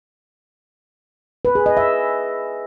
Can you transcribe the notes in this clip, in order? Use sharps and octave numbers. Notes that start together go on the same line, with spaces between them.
B4
G#4
D#5
E5